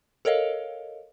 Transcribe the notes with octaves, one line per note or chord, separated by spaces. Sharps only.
A4 A#4 C#5 D#5 F5